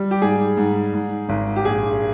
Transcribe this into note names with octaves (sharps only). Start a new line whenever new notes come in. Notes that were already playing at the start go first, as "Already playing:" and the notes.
Already playing: G3
G4
G#2 G#4
G#2
G#2
G#1
G4
A#1 G#4